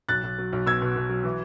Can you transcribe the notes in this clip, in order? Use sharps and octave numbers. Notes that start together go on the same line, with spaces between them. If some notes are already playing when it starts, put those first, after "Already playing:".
B1 F#6 A6
B1
F#3
B1
B2 E6 G#6
B2
B2
F#3
E3